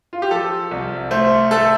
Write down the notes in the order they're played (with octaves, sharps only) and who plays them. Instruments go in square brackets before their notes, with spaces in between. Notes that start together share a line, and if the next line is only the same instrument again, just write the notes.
[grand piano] F4
G4
F3 A4
C2
A3 C5
A3 A4